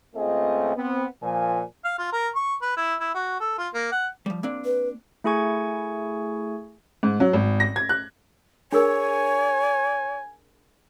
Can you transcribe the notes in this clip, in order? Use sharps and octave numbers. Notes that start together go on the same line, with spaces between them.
C#2 A3 C4 F4 G#4 D#5
B3 C4
A#2 F3 G#5
F5
F4
A#4
C#6
B4
E4
E4
F#4
A4
F4
A#3
F#5
F3 G3
A#3 C4 D4
B4
A3 E4 G#4 G#5 C#6 G#6
G#2
F#3
G#1
A#6
G#6
F#6
D4 G#4 A#4 C#5 G#5